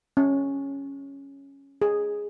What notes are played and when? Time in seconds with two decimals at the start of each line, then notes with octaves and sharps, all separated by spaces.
0.17 C#4
1.82 G#4